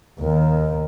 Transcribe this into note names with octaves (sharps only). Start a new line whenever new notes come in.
D#2 D#3